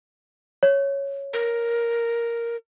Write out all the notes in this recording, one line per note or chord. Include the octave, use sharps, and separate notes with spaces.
C#5
A#4